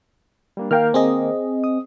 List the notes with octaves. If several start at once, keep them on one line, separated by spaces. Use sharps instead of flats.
G3 A#3 D4
D#3 A#3 A#4 F5 G5 F6
C4 G#4 D#5
D#6